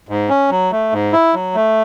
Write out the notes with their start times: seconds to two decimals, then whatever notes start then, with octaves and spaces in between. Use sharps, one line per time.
0.09 G#2
0.29 C#4
0.50 F#3
0.72 A3
0.93 G#2
1.13 E4
1.34 F#3
1.55 A3